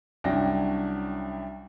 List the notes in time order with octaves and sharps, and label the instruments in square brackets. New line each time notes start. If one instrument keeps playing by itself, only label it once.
[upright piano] C2 F#3 C#4 D4 G5 A#6